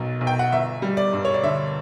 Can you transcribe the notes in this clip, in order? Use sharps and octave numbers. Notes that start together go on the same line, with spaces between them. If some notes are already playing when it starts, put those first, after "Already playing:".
Already playing: B1 B2 F#3
B1
G5
F#5
G1 E5
G3
D5
G2
C#5
D5
D3 E5